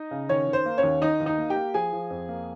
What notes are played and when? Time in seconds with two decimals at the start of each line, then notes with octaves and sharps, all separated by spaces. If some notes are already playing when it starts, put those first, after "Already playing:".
Already playing: D#4 D#5
0.11 C#3
0.29 D#3 C#4 C#5
0.47 D#3
0.53 C5
0.66 A#3
0.78 C#4 C#5
0.83 D#2
1.02 D#3 D#4 D#5
1.20 D#2
1.26 D#4 D#5
1.38 A#3
1.50 G4 G5
1.56 A#3
1.74 F3 G#4 G#5
1.93 F3
2.10 F2
2.29 A#3